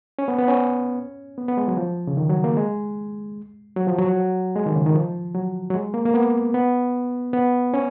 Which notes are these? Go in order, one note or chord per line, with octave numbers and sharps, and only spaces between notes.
C#4
B3
B3
C#4
B3
B3
G#3
F#3
F3
C#3
D#3
F#3
A#3
G#3
F#3
F3
F#3
G#3
D#3
C#3
D#3
F3
F#3
F#3
G#3
A#3
A#3
B3
B3
B3
C#4